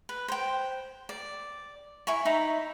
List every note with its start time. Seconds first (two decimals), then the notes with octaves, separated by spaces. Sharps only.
0.09 B4
0.28 C5 G5
1.09 D5
2.07 E4 G#5 C#6
2.25 D#4 E5 A#5 B5